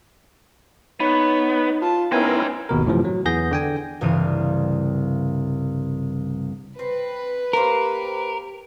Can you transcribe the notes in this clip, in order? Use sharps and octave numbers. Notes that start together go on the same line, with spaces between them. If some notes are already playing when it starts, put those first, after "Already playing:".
B3 D#4 C#5
F4 A5
B3 C#4 D#4 E4 A#4 C5 G5 G#5
G#1 D#2 B2 A#4
F#2 A2 C3 E3 F3
F#3
E2 E3 B3 G#4 G6 A#6
D3 G5 G#5
C2 G2 C#3 E3 F5 D#7
C4 B4
A#3 G4 A#4 C5